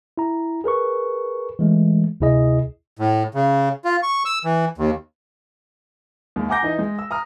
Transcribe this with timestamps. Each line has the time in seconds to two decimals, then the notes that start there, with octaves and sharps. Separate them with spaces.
0.18 E4 A#5
0.64 G#4 A#4 B4 C#6
1.59 E3 G#3 A3
2.20 D2 C3 E4 G#4 D#5
2.99 A2
3.35 C#3
3.85 F4
4.03 C#6
4.25 E6
4.45 E3
4.78 D#2
6.36 D#2 G#3
6.48 F#5 G#5 A#5 D6 G6 A#6
6.63 E3 D#4 D#5
6.79 G#3
6.99 E6
7.11 A#5 D#6 F6